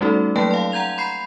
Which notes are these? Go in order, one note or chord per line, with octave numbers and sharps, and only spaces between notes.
G3 A3 C#4 D#4 F#4 A4
F#3 A3 A#3 G5 A5
F5 C6
F#5 A#5 G6 G#6 F7
B5 C6 G6 C7